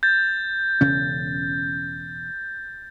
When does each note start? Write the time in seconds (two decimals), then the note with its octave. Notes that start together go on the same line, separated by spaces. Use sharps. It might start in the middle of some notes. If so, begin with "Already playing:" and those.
0.03 G6 A6
0.81 E1 C#3 C#4